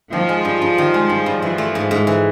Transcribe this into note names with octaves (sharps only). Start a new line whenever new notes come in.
D#3 F3
G#3
G2
G2
D#3
G#3
G2
G2
E3 F3
A3
G#2
G#2
E3